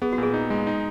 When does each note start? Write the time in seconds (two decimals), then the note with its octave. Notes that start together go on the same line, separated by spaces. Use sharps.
0.02 B3 G#4
0.13 F#4
0.18 A#2 G#4
0.34 D#4
0.50 G#3
0.67 D#4